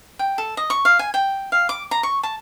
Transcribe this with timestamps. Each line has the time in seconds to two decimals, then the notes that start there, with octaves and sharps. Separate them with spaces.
0.19 G5
0.38 A4
0.57 D#5
0.70 C#6
0.85 F5
0.99 G#5
1.14 G5
1.52 F5
1.69 D6
1.91 A#5
2.03 C#6
2.23 A5